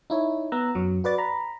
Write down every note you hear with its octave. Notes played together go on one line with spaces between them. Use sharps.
D#4 E4 C#5
B3 A#5 E6 F#6
F#2 F#3
F#4 B4 D5 A6
A#5 B5